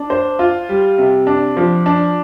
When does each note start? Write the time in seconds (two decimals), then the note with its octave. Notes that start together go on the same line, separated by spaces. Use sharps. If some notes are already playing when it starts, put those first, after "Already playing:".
Already playing: D4
0.10 C5
0.39 F4
0.69 G3
0.98 C3
1.27 D4
1.57 F3
1.86 D4